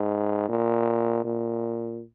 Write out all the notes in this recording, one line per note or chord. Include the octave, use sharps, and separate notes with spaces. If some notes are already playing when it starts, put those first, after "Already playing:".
Already playing: G#2
A#2
A#2